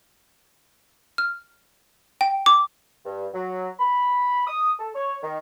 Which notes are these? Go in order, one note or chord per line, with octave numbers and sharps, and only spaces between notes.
F6
G5
D6
G2
F#3
B5
D#6
A4
C#5
D#3